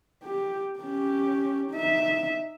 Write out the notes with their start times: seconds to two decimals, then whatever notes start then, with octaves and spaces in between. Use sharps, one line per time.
0.24 G4
0.79 C#4 G4
1.71 D#4 E5